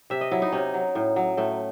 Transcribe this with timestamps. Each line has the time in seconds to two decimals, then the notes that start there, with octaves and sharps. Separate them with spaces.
0.10 C3 E5
0.21 D#5
0.31 F#3 E4
0.42 D#4
0.52 C3 C#4
0.74 F#3
0.95 A2
1.16 F#3
1.37 A2 A3